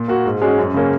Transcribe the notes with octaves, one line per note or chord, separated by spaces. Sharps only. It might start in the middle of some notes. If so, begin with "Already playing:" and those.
Already playing: A#2
A#3 F#4
G#2
G#3 C#4 F#4
F#2
C#3 A#3 C#4